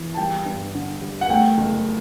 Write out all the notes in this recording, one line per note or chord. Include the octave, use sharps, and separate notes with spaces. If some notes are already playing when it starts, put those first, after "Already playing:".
Already playing: E3
A5
G3 G5
G2
D3
G3
F#5
A3 G5
F#1